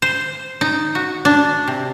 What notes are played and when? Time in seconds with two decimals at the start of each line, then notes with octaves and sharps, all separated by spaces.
0.02 C5
0.61 D#4
0.95 F#4
1.25 D4
1.67 C3